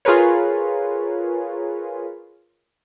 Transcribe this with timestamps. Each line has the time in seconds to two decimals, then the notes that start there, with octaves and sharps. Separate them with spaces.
0.05 F4 G#4 A#4 B4 C#5